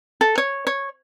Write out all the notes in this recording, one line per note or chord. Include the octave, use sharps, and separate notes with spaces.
A4
C#5
C#5